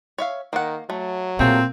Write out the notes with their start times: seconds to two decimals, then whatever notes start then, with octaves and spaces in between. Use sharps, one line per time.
0.18 C#5 E5 F5
0.53 D#3 A#3 F#5
0.90 F#3 A3
1.39 A#2 A3 A#3 C4 G#4 A4